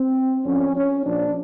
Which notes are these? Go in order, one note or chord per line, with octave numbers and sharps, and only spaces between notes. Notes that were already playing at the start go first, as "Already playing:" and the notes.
Already playing: C4
F2 D3 F3 C#4
C#4
A#1 A#2 F3 D4